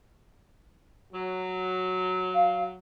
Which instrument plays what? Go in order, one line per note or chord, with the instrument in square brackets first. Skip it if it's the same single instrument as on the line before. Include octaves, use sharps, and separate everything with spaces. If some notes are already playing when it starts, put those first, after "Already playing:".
[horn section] F#3
[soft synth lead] F5